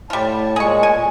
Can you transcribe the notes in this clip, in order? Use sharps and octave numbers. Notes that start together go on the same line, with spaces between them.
A2 G3 F4 A5
A#2 G#3 G#4 C#6
G#5